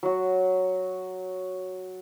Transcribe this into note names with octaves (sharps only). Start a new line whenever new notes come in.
F#3 F#4